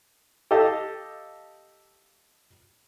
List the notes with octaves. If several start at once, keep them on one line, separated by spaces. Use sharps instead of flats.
G4 A4 D#5 F5 A5